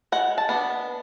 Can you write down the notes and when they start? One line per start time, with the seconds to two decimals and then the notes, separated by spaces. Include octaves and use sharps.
0.12 G#3 F#5
0.38 A5
0.49 B3 D4